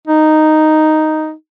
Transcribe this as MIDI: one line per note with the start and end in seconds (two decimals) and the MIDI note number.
0.08 1.33 63